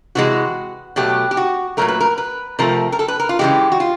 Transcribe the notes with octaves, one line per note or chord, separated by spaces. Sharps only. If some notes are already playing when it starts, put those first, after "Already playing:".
C3 E3 G#3 F#4
B2 F#3 A3 G4
G4
F#4
A#2 F#3 A3 A#4
B4
A#4
B4
C3 F3 A3 A#4
A#4
A4
B4
A#4
F4
C#3 E3 G#3 G4
F#4
F4